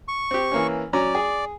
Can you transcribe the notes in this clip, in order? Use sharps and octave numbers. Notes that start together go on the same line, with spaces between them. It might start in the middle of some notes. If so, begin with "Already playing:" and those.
C#6
C4 G4
E3 A#3 C#4
F#3 C#4 D5 A#5
G#4